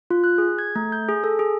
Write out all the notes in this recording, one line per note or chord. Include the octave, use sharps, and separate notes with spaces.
F4
F#6
G#4
G#6
A3
G6
G#4
A4
G#4